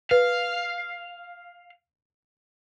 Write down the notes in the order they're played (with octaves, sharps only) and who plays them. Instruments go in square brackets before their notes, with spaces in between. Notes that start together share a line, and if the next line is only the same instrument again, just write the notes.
[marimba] B4 [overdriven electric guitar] F5